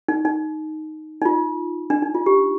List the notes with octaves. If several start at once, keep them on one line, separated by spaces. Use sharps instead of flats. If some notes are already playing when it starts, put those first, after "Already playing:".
D#4
D#4
D#4
F4
D4
D#4
F4
G4